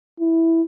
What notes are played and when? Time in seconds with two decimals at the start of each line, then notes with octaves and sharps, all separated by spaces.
0.20 E4